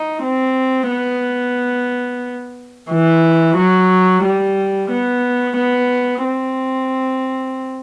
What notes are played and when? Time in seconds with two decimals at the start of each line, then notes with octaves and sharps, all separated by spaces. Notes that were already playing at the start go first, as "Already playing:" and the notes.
Already playing: D#4
0.23 C4
0.90 B3
2.90 E3
3.58 F#3
4.24 G3
4.91 B3
5.58 B3
6.24 C4